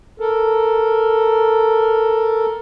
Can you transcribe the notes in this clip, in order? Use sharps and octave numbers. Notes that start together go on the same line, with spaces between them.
A4 A#4